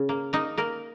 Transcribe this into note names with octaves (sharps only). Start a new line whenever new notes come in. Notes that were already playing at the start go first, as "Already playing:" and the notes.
Already playing: C#3
A#3
A#3 D#4
A#3 A#4